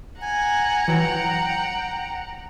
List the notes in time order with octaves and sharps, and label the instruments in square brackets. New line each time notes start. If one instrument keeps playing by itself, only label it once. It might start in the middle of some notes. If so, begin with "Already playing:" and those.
[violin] F#5 A#5 [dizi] G#5
[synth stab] E3 F#3 [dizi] G5